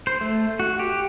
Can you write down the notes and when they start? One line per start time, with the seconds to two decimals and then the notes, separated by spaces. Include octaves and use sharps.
0.07 C5
0.21 A3
0.60 F#4
0.79 G4